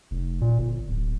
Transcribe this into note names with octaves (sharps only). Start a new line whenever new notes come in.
F1
A#2
G1
D1